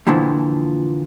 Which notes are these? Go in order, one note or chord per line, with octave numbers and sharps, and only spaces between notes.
F2 A#2 D3 E3 F3